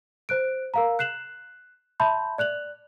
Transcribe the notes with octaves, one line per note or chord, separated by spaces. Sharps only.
C5 F#6 D7
A#4 F5 A#5
F#6 C7 E7 F#7
E5 A5 B5 C6 G6
D5 F#6 F7 F#7